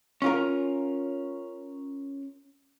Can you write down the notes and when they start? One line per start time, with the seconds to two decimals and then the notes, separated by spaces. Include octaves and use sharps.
0.22 C#4 F4 A#4